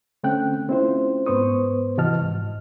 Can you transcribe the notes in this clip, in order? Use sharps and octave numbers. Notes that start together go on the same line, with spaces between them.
D3 A3 C4 C#4 G5 F#6
A3 C4 C#4 E4 F4 C5
G#2 B3 B4 C5 C#6 D#6
C3 E3 F#4 D#5 A5 F6
G#2